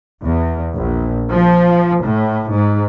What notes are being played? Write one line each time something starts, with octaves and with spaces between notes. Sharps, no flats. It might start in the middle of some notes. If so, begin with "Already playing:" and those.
E2
A#1
F3
A2
G#2